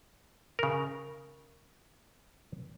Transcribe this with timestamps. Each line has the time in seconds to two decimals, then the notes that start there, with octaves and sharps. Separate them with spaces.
0.59 C#3 A#4